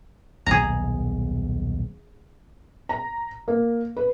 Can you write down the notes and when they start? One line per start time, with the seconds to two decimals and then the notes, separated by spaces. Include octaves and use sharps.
0.46 D#1 B1 B3 G#4 A#5
2.89 A#5
3.48 A#3
3.97 B4